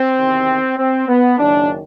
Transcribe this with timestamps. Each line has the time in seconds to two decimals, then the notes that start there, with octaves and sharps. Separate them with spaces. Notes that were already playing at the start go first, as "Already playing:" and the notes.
Already playing: C4
0.17 E2 C3 D#3
0.78 C4
1.08 B3
1.38 F#1 F#2 D#3 D4